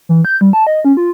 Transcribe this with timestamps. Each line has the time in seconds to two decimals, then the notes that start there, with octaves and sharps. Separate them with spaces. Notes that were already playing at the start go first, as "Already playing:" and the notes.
0.09 E3
0.25 G6
0.41 G3
0.53 A5
0.67 D#5
0.85 C#4
0.97 F4